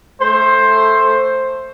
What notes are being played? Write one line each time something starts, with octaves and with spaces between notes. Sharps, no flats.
A3 C5